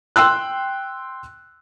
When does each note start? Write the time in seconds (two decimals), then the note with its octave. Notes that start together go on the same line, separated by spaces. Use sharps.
0.16 G5 C6 E6 F#6